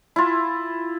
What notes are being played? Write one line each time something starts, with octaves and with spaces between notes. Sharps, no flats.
E4 F4